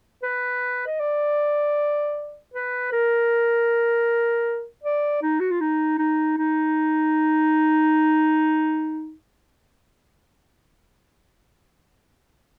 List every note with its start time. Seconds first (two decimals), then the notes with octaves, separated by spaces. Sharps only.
0.23 B4
0.87 D#5
1.00 D5
2.54 B4
2.92 A#4
4.83 D5
5.22 D#4
5.40 F#4
5.50 F4
5.60 D#4
5.98 D#4
6.37 D#4